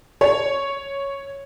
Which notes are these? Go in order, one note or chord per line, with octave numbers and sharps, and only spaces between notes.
C#5